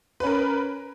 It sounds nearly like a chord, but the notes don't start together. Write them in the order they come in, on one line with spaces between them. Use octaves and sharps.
B4 C#4 A#4